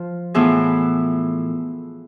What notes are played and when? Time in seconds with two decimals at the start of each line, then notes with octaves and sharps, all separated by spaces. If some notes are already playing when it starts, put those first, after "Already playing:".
Already playing: F3 F4
0.34 A2 E3 B3 F4 G#4